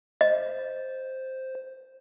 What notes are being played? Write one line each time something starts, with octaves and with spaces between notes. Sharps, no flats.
C5 D#5